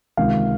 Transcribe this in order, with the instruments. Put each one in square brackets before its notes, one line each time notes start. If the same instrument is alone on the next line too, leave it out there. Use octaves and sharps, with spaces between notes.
[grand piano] C#2 C3 D#3 F5